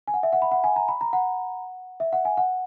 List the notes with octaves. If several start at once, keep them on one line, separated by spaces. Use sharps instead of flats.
G#5
F#5
E5
F#5
B5
F#5
G#5
A#5
B5
A#5
F#5
E5
F#5
G#5
F#5